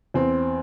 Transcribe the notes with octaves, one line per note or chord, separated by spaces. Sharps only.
E2 C4